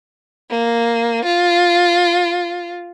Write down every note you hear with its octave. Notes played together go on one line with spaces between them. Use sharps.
A#3
F4